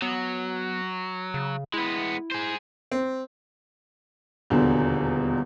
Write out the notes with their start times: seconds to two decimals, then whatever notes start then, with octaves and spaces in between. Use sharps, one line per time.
0.02 F#3 B3
1.34 C#3
1.74 G#3 B3 E4
2.32 G#4 C5
2.92 C4
4.50 D#1 E2 B2 D3